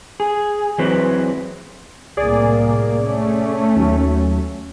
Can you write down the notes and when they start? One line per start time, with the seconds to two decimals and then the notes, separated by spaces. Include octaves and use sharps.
0.20 G#4
0.78 E3 F#3 G#3 C4 F#4 B4
2.17 C2 A2 A#3 G#4 D5
3.04 A3 C#4
3.76 D#2 F#3